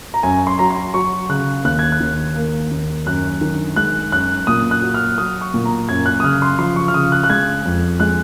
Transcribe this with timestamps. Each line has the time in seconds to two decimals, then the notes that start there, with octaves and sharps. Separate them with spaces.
0.14 A#5
0.23 F#2 G#5
0.47 C6
0.59 F#3 A#5
0.70 C6
0.94 F#3 C#6
1.29 C#3 F#6
1.64 D#2 F#6
1.79 G#6
1.92 F#6
2.00 D#2
2.36 A#3
2.71 D#2
3.06 F#2 F#6
3.41 D#3
3.76 G#3 F#6
4.12 F#2 F#6
4.47 A#2 D#6
4.71 F#6
4.82 F#3
4.94 F6
5.18 F#3 D#6
5.41 C#6
5.54 A#2
5.65 A#5
5.89 F#2 G#6
6.06 F#6
6.20 D#6
6.23 C#3 F6
6.42 C6
6.59 F3 C6
6.76 C#6
6.88 F6
6.94 C#3 D#6
7.12 F#6
7.24 F#6
7.30 G#3 G#6
7.66 F2
8.00 G#3 F#6